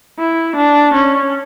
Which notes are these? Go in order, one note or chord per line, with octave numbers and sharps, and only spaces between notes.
E4
D4
C#4